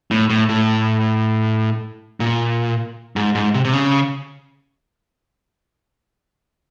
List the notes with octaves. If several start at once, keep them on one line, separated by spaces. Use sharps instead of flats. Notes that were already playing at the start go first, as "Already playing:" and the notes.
A2
A2
A2
A#2
G#2
G#2
C3
C3
C#3